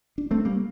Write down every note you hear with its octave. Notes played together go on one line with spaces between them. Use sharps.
D4
A3 C4
G3 A#3